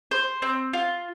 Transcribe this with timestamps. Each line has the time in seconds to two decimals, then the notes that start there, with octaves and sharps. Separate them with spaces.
0.11 C5
0.42 C4
0.73 F4